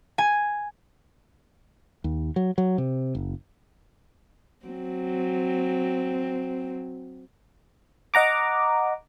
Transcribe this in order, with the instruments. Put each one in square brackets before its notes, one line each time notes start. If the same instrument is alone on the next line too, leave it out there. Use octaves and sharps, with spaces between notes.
[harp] G#5
[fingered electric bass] D#2
F#3
F#3
C3
F#1
[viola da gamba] F#3 C4
[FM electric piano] D#5 F#5 A#5 D6